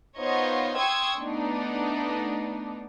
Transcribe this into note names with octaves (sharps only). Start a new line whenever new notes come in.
B3 D#4 F4 C5 C#5 D#5
G5 C6 C#6 D#6 E6 G#6
A3 B3 D4 D#4